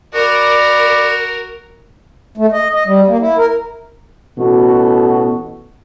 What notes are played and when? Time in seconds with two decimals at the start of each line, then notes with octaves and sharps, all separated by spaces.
0.15 F#4 A#4 D5 B5
2.38 A3
2.52 D#5
2.74 D#5
2.86 G3
3.08 A#3
3.20 E4
3.37 A#4
4.38 A1 B2 F#4 A4